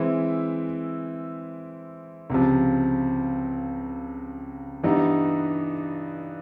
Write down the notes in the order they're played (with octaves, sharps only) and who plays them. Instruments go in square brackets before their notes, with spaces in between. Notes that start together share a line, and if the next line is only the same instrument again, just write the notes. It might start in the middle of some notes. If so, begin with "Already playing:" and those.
Already playing: [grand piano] E3 G#3 C4 E4
C#2 C3 F3
G2 E3 G3 B3 D#4